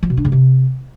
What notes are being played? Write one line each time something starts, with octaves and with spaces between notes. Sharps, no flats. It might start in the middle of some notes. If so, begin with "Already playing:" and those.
F3
B2
D4
C#3
C3